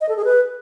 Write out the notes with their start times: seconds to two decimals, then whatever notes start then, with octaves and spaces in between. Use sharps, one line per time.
0.01 D#5
0.09 A4
0.17 G#4
0.25 B4